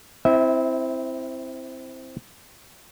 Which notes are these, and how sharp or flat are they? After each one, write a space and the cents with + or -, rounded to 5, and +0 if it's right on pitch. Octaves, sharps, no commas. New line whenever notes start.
C4 +0 E4 +0 E5 -30